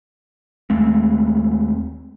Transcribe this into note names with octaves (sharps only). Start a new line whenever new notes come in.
D#2 G#3 A3 C4